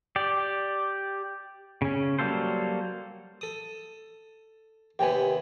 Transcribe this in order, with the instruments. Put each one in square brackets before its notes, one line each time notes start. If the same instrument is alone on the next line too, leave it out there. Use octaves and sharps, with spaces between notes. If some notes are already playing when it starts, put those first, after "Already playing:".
[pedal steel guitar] G4 D5
C#3 C#4
F#3 G3 A#3 A4 C5
[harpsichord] A4 D#6
[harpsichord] D#2 C3 B3 [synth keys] G5 G#5